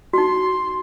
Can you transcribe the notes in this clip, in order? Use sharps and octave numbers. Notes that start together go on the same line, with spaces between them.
D#4 F#4 C6